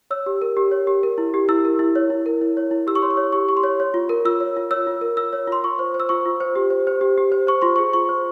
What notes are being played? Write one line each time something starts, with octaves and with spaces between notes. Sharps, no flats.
C#5 E6
G4
A#4
G4
C#5
G4
A#4
E4
G4
E4 E6
A#4
E4
C#5
E4
A#4
E4
C#5
E4
G4 E6
C#6
C#5 C6
C#6
C#5
G4 C#6
G4 C#6
C6
C#5
C#5
F4
A#4
F4 E6
C#5
F4
C#5 E6
F4
A#4
F4 E6
C#5
F4 C6
F4 C#6
C5
C5
E6
F4 C#6
F4
C5
G4
C5
C5
G4
G4
C5
C5 C#6
F4 C6
C#6
G#4
F4 C#6
C5